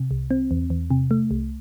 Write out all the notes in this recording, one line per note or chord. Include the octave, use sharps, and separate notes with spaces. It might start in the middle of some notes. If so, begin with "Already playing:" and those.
Already playing: C3
C2
C4
E2
E2
C3
A3
C2